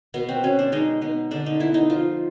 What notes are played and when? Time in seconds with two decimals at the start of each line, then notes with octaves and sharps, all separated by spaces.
0.14 B2 B3
0.29 C4
0.43 B2 C#4
0.59 D4
0.72 G#3 D#4
1.01 B3 D#4
1.31 D3 D4
1.46 D#4
1.60 B3 E4
1.74 D#4
1.90 F3 F4